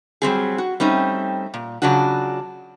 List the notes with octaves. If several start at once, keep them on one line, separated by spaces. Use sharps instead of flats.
F#3 G3 C4 G#4
F#4
G3 A3 C4 C#4 D#4
A#2
C#3 F#3 D4 F4 F#4